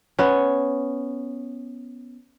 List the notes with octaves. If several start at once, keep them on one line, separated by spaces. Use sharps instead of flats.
B3 C#4